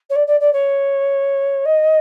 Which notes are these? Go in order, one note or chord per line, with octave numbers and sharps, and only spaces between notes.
C#5
D5
D5
D5
C#5
D#5